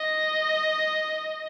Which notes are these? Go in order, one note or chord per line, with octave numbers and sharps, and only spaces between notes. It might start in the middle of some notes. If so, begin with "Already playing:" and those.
Already playing: D#5